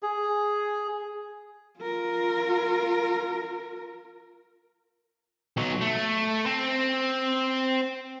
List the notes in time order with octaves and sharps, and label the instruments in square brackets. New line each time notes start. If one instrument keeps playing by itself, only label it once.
[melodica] G#4
[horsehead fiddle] F4 A#4
[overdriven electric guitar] B1 F#3
A3
C4